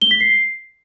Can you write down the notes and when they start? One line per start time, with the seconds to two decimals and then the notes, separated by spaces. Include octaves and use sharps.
0.02 G7
0.11 B6
0.20 C7